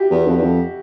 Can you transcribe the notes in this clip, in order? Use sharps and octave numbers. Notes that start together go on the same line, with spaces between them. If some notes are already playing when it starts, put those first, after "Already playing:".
Already playing: E4 F#4 G4
E2
F2
E2
F2